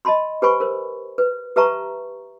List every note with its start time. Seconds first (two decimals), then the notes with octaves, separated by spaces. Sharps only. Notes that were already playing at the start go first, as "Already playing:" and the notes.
0.05 D#5 A5 B5 C6
0.42 G4 B4 C5 G#5 B5 C#6
0.60 A#4 C5
1.18 B4
1.56 G4 B4 E5 A5 A#5 C#6